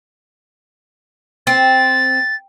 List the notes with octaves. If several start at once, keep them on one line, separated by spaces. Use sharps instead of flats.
C4 A6